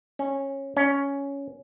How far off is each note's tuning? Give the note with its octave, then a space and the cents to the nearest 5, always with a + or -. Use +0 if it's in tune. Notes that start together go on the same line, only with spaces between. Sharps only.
C#4 -15
C#4 +10